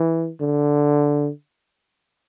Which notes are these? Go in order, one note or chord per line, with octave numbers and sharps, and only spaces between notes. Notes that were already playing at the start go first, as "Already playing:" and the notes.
Already playing: E3
D3